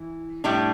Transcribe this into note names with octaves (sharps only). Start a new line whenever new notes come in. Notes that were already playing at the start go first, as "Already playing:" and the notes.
Already playing: E3 E4
A2 G3 D4